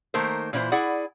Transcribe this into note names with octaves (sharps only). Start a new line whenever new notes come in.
D#3 A3 A#3 A#4 C5
A#2 E3 E4 C5
E4 G#4 D5 F#5